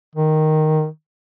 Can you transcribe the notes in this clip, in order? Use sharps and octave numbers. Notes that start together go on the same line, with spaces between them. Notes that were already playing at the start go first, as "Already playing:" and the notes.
D#3